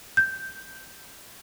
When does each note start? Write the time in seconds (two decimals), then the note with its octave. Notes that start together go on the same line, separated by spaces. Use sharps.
0.17 G6